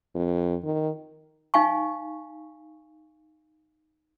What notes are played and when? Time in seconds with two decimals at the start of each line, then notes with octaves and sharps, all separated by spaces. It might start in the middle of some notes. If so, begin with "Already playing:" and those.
0.15 F2
0.64 D#3
1.54 D#4 F5 G#5 C#6